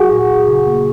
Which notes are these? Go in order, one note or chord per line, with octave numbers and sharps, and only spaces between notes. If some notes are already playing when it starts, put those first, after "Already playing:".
Already playing: F#4 G#4
A#2
A#2
C#3
A#3